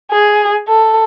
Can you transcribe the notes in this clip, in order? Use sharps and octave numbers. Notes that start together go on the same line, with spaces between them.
G#4
A4